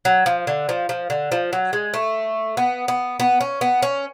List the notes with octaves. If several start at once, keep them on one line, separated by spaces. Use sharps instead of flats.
F#3
F3
D3
F3
F3
D3
F3
F#3
G#3
A3
B3
B3
B3
C#4
B3
C#4